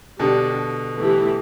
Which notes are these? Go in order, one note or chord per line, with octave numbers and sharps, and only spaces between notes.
B2 D3 G3 D4 G4
E3 A3 E4 G4